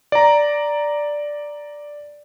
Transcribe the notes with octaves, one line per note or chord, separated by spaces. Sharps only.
D5 A#5